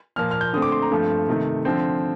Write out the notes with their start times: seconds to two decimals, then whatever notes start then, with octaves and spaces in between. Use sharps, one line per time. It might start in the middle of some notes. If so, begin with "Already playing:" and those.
0.16 A#2 F3 A#3 F6
0.31 F6
0.41 G6
0.53 D3 A3 C4 D#6
0.62 D6
0.72 C6
0.82 A#5
0.91 G2 F3 A3 C4
1.29 C3 D#3 A3
1.65 D3 F3 C4